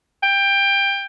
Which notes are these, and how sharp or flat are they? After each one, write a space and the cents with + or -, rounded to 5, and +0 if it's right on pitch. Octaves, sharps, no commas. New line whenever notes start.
G5 +20